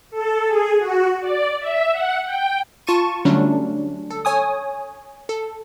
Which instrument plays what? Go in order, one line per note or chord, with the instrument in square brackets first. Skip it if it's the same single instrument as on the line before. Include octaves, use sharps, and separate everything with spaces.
[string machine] A4
G#4
F#4
D5
E5
F#5
G5
[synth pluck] F4 A5 C#6 D#7
D3 F#3 G3 A3 C#4 D4
A4
C#5 G#5 D#6
A4